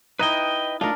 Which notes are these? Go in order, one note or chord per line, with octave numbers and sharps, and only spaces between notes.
D#4 E4 B4 D#5 G5
A3 D4 D#4 F4 A#4